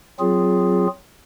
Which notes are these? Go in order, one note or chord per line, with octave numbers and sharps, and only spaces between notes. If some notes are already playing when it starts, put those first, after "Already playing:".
F#3 C4 F4 G#4